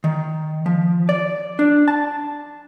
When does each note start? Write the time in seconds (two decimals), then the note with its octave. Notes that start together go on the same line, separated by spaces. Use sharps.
0.04 D#3
0.66 F3
1.09 D5
1.59 D4
1.88 A5